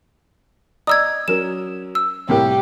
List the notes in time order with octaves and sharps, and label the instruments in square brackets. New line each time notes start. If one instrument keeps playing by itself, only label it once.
[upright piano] D5 D#5 A#5 [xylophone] D#6 E6 G#6
[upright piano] F#3 C#4 A#4 [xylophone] E7
[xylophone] E6
[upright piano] C2 A2 A#4 [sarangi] G4